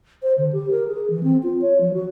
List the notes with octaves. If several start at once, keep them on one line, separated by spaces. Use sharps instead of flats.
C5
D3
G4
A#4
G#4
E3
C4
F4
C#5
F3
F#4